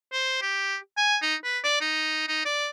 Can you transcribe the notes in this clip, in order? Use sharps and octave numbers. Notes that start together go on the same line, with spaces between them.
C5
G4
G#5
D#4
B4
D5
D#4
D#4
D5